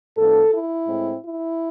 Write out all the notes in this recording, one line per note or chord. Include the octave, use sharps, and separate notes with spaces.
A2 F3 B3 D4 A4
E4
A2 G#3 C4
E4